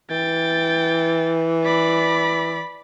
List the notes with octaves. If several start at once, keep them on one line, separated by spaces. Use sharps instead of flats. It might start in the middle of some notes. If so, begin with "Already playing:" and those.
E3 G5 A6
D5 B5